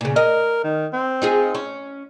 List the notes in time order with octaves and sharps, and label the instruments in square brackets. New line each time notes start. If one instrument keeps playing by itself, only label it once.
[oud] A#2 C#3
[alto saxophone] A#4 [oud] D#5
[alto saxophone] D#3
C4
[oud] D#4 F4 G#4
C#4